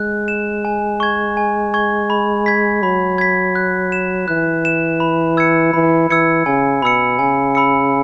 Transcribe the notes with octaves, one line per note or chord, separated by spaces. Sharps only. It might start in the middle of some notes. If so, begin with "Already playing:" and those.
Already playing: G#3 F#6
E7
G#5
C#6 G#6
G#5
C#6 G#6
B5
G#6 B6
F#3 B5
G#6 B6
F#6
E7
E3 F#6
E7
B5
E6 G#6 C#7
E3 B5
E3 E6 G#6 C#7
C#3 G#5
B2 B5 E6 C#7
C#3 G#5
B5 E6 C#7